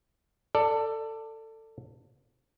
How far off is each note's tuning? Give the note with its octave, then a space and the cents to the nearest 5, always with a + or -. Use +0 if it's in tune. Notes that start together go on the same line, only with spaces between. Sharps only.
A4 +20 D5 +5